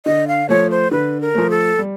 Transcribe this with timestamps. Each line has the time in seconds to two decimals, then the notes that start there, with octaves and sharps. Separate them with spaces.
0.06 D3 D#5
0.28 F5
0.49 F3 A3 C#5
0.70 C5
0.91 D3 B4
1.21 A#4
1.34 F3 A3
1.50 A4
1.79 G3